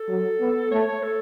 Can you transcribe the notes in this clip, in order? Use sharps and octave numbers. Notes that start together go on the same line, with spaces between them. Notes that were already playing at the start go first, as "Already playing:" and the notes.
Already playing: A4
F#3
B3
A3 C#5
C#5
A4